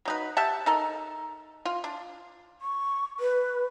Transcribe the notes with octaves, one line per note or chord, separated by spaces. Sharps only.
F#3 D#4 B4
G4 E5 F#5 A5
D#4 A4 A#4
F4
D4
C#6
B4